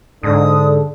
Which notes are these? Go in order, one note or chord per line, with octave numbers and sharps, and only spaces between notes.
G#2 D3 D#6